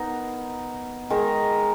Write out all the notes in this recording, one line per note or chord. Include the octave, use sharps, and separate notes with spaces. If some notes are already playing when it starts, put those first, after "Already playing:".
Already playing: B3 D#4 A#4
D#3 G#3 D#4 A#4